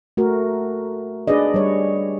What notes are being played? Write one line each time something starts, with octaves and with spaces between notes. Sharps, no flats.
A3 F#4 A#4
D4 G#4 B4 D5 D#5
G3 C#5